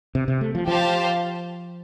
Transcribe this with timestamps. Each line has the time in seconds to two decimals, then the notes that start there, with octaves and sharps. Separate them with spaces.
0.15 C3
0.28 C3
0.41 A3
0.55 F3
0.68 F3 G4 C5 F5 A5